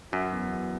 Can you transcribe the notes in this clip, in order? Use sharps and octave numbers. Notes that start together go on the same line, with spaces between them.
F#2 F#3
E2
E2